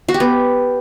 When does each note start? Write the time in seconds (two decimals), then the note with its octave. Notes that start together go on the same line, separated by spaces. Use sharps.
0.08 F#4
0.14 G4
0.20 B3